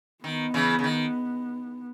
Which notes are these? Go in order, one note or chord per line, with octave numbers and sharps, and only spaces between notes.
D#3 B3
C#3 E3
C#3
D#3